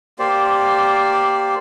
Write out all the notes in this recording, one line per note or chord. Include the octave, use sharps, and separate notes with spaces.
A#3 G4 C5 D5